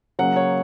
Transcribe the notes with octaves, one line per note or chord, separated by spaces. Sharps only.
C#3 F#3 A#3 C#4 F#5
C#5